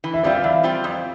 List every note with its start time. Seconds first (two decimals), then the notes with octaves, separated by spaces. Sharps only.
0.04 E3
0.14 E5
0.23 G3 C4 F4 D5
0.34 E5
0.44 E3 F5
0.64 G3 C4 F4
0.84 F2